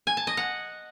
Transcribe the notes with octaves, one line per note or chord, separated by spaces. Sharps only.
G#5
A5
D#5
F#5